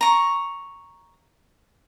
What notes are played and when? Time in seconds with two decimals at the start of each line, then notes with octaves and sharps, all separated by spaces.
0.01 A#5 C#6